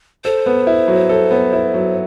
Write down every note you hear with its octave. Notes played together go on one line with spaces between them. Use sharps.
A4 C5
B3
E4
F#3
A4
B3
E4
F#3